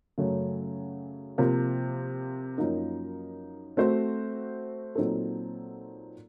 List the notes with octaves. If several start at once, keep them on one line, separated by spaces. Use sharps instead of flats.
F#2 C#3 F#3 A3 C#4
C3 F3 A#3
F#2 F3 A#3 D#4 A#4
A3 C4 F#4 C5
A#2 F#3 C4 D#4 A4